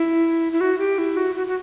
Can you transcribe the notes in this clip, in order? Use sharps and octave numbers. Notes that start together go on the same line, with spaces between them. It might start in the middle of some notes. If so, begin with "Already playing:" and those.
Already playing: E4
E4
F#4
G4
E4
F#4
F#4
F#4